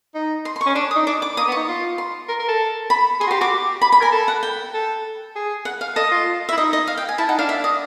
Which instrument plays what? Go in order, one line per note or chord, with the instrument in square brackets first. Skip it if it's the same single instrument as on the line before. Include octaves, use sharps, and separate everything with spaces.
[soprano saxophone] D#4
[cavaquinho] C6
C6
C#6
[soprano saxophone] C#4
[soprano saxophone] D4 [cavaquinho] D6
[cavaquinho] D#6
[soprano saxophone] D#4
[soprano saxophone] D4 [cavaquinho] D6
[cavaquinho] D6
[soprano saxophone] A#3 [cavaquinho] D#6
[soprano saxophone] B3
[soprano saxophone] D#4 [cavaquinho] C#6
[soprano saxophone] F4
[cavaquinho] C6
[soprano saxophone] A#4
A#4
A4
[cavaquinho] B5
[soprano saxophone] G#4 [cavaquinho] C6
[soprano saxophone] F#4
[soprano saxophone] G4 [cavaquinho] C6
[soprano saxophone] F#4 [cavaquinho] D6
[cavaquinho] B5
B5
[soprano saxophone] A#4 [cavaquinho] G#5
[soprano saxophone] A4
[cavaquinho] F#5
G5
[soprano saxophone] A4
G#4
[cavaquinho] F#5
F5
[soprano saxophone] A4 [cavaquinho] D#5
[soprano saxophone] F4
[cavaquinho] E5
[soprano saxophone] E4
[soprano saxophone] D#4 [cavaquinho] D#5
[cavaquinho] D#5
F5
G5
G#5
[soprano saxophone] E4 [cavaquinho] A5
[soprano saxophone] D#4 [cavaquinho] F#5
[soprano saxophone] D4 [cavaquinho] F5
[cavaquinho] E5
D#5